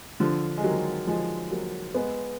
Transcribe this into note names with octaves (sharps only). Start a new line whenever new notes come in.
D3 F3
G#3
D#3 F#3
F3 G#3
F#3 A#3
G#3 B3